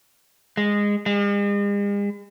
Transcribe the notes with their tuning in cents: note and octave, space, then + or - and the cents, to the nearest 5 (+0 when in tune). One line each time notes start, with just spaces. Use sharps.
G#3 -15
G#3 -45